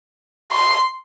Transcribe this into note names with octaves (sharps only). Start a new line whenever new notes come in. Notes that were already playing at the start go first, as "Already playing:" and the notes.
C6